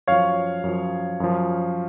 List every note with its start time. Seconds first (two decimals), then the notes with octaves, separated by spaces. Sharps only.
0.07 F#2 F3 C#5 F5
0.64 F#2 F3
1.20 F#2 F3